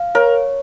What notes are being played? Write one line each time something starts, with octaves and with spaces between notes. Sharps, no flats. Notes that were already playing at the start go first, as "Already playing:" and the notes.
Already playing: F5
A#4 C#5